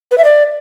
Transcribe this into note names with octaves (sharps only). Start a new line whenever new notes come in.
B4
E5
D5